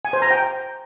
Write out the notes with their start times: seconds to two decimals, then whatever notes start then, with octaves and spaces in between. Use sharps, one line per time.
0.05 G#5
0.13 C5
0.22 A#5
0.31 G5